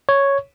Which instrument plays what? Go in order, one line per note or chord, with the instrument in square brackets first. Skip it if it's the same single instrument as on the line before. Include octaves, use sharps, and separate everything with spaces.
[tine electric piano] C#5